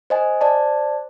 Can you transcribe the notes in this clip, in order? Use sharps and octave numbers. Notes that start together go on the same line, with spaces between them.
C5 D#5 G#5
C5 D5 A5